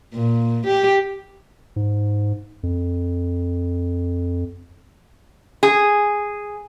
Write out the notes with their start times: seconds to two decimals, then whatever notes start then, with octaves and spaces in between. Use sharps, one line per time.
0.14 A#2
0.66 G4
1.76 G#2
2.63 F2
5.63 G#4